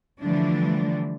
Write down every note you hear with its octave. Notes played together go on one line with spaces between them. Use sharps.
D3 E3 F3 G3 A3 D4